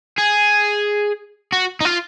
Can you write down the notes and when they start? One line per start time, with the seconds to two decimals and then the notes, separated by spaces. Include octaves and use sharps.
0.18 G#4
1.52 F#4
1.81 D#4
1.85 F4